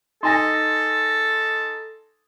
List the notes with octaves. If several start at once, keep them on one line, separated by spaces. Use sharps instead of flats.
D#4 A4 G#5 C6 D#6 A6 A#6